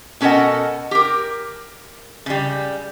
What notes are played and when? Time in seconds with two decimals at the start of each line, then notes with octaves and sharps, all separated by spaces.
0.21 B2 C#4 A4 A#4 D#5 F#5
0.91 G4 A#4
2.26 C#3 G3